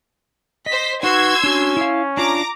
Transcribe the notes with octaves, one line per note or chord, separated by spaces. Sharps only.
C5 D#5 B6
D#4 F#4 B4 C6 E6 G#6
C#4 D4 F#4
E4 F5
D4 F4 A#5 D6